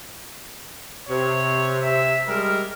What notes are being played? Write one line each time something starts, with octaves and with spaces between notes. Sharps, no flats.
C3 C#5
E5
G3 G#3 A#4